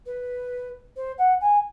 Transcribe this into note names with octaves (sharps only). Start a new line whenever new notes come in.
B4
C5
F#5
G#5